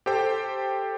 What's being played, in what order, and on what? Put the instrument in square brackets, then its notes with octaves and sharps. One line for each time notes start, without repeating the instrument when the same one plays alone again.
[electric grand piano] G4 A4 C5 G5